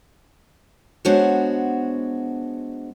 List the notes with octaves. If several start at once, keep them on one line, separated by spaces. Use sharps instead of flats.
G#3 B3 D4 F#4 C5 C#5